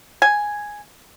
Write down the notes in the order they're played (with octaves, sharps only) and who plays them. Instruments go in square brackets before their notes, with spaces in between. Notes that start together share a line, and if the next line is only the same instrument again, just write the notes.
[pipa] G#5